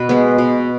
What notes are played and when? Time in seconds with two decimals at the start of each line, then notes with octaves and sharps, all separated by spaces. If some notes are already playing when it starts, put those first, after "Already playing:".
Already playing: B2 B4
0.09 G#3 B3
0.38 B2